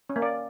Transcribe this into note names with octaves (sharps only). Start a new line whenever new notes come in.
C#4
A#3
D5